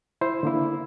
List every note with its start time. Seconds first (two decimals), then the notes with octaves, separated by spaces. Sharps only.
0.21 E4 C5
0.43 D3 A#3 E4